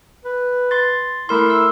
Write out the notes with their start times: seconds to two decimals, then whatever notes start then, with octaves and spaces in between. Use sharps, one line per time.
0.25 B4
0.71 C6 A6
1.29 A3 E4 A#4 C6
1.50 E6